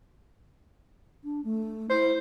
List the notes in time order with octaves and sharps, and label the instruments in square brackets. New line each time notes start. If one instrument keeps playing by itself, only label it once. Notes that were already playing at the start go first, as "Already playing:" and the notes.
[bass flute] D4
A3
[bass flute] E4 [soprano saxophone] C5